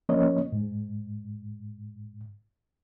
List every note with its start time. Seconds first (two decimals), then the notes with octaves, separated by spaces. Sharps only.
0.09 F3 A#3 C#4 C#5 D#5
0.52 G#2